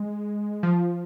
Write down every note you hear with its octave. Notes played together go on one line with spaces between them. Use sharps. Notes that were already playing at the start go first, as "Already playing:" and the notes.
Already playing: G#3
F3